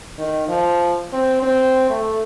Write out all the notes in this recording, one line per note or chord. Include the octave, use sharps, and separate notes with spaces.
D#3
F3
C4
C4
A3